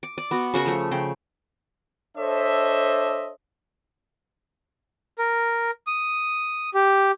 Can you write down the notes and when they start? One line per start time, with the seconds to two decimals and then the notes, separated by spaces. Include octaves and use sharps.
0.03 D6
0.18 D5
0.31 B3 F#4
0.54 C#3 F#4 A#4 C#6
0.66 F3 A3
0.91 C#3 G5
2.17 D4 A4 C5 C#5 D#5 E5
5.18 A#4
5.87 D#6
6.74 G4